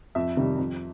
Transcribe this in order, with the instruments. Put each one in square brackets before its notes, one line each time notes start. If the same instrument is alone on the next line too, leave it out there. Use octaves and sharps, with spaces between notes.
[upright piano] F2 E5
C3 D#3 G3
F2